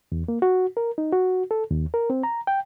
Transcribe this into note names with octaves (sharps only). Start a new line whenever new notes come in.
E2
A#3
F#4
A#4
D#4
F#4
A4
D#2
A#4
C4
A#5
G5